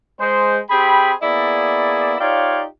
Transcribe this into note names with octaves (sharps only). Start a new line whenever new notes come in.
G#3 C5
C4 G4 G#4 G5 B5
A#3 B3 E4 G#4 D5
D#4 F4 G4 C#5 D5 F5